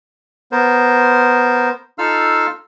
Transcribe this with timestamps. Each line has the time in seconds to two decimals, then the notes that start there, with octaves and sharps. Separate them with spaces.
0.52 B3 A#4 C5
1.98 D#4 F4 A4 F5 E6 F6